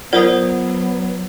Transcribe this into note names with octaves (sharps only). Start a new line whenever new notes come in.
F#3 B3 F4 A#4 C5 D5 F#5 D#6